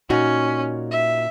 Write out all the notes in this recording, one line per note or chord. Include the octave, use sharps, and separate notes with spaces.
A#2 C#4 D#4 F#4
E5